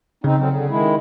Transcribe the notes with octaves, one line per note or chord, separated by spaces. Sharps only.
C#3 C4 D#4
D3 F#3 C4
D3
D#3 G#3 E4